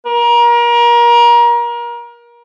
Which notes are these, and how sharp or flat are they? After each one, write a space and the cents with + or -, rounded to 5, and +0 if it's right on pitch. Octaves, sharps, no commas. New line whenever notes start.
A#4 +30